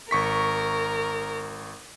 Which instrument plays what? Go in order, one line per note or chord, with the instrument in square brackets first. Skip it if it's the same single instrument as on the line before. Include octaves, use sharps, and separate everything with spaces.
[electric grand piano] G#1 C#6 B6 [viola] A#4